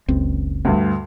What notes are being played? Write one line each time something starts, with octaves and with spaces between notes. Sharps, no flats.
F#1 C#2 C4
D2 G2